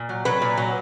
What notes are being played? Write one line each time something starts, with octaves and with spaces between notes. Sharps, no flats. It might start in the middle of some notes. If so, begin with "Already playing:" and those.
Already playing: A#2
F#3
F#3 B4
A#2
F#3